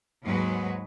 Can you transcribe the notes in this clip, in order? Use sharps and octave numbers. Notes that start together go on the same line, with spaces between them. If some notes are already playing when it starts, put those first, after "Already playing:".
D#2 G#2 F#3 G#3 F#4 B4